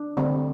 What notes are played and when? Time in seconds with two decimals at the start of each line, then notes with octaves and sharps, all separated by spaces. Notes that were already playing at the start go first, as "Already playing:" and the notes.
Already playing: D4
0.17 D3 G3 C4